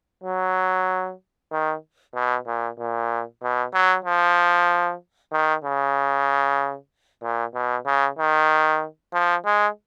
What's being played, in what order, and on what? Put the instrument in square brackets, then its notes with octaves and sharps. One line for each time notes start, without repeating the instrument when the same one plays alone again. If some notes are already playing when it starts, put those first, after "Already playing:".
[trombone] F#3
D#3
B2
A#2
A#2
B2
F#3
F3
D#3
C#3
A#2
B2
C#3
D#3
F3
G#3